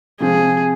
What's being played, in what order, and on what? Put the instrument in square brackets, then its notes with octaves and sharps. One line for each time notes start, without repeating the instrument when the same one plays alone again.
[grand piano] C3 F3 G#3 C4 [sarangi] G#4